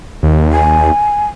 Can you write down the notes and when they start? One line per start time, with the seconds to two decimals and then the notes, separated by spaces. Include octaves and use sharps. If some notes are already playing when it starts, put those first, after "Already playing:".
0.23 D#2
0.53 G#5